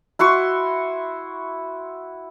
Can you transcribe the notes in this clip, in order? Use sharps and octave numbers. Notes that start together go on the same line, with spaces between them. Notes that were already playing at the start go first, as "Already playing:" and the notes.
E4 F#4 C6 C#6